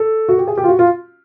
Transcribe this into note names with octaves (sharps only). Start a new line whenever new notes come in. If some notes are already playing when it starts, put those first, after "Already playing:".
Already playing: A4
F#4
G4
G#4
G4
F4
F#4
F4